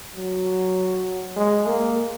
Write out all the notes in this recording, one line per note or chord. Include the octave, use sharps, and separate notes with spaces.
F#3
G#3
A#3